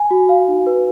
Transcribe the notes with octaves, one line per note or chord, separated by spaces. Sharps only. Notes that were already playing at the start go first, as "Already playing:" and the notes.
Already playing: G#5
F#4
F5
D#4
B4